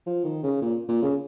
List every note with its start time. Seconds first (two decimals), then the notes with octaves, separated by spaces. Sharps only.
0.06 F3
0.25 D#3
0.44 C#3
0.62 A#2
0.89 A#2
1.02 C#3